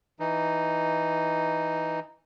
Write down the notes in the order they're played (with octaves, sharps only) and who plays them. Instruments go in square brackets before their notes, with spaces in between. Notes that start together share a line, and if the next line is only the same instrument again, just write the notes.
[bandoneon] E3 D#4